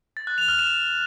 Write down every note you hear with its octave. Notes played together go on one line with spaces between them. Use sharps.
A6
F#6
F7
F6
E7